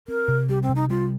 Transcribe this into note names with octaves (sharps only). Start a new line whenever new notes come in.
C4 A#4
C3
G3 G4
C4
C3
D#4
G3 F4